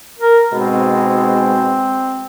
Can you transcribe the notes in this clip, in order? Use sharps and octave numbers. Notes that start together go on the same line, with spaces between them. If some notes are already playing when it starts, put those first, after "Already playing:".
A#4
G#2 B2 G#3 C4